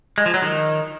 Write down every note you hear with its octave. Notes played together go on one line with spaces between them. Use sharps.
G#3
F3
F#3
D#3